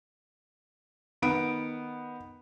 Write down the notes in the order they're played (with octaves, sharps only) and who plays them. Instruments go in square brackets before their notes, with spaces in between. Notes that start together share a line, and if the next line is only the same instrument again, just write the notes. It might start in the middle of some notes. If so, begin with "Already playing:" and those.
[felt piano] D#3 B3 D7